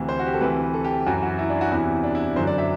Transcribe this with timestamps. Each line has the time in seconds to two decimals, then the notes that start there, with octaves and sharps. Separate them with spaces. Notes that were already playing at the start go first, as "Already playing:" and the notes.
Already playing: D2 C3 E3
0.09 C5
0.19 F#4
0.26 G4
0.34 A4
0.41 D2 C3 E3 B4
0.74 A4
0.84 G4
1.07 F#2 E3 F#4
1.22 F#4
1.39 E4
1.50 D4
1.61 F#4
1.71 E2 C3 E3 E4
2.04 D4
2.15 E4
2.36 F#2 D3 F#3 C5
2.47 D5
2.58 E5